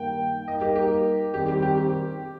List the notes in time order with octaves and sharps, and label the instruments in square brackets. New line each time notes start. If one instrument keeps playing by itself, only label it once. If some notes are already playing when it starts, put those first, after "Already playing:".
Already playing: [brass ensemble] G2 D#3 A#3 [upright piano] G5
[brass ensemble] G3 A#3 D#4 A#4 [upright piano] D#5
[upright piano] G4
G4
[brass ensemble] D#3 G3 C4 [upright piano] G4
[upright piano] G4
G4
G4